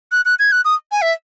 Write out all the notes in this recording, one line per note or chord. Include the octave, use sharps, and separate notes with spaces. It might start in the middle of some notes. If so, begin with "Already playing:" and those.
F#6
F#6
G#6
F#6
D#6
G#5
E5